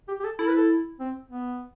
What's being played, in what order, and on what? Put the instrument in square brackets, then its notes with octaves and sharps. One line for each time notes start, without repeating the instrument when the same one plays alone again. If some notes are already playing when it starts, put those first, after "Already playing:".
[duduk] G4
G4
A4
[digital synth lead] E4 [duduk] A4
[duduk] B4
A4
C4
B3